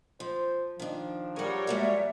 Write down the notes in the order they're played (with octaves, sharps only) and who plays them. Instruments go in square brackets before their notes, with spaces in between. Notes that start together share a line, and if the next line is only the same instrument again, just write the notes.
[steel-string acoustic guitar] F3 [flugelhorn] C5
[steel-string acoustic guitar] D#3 D4 [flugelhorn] F3
[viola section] G3 A#4 C#5 [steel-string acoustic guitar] G#4 F#5
[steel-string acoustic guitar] G#3 A#3 F#4 [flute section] D5 E5